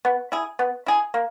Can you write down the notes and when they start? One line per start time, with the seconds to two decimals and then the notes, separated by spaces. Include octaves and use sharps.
0.05 B3
0.32 E4 G#4
0.59 B3
0.86 E4 G#4
1.14 A#3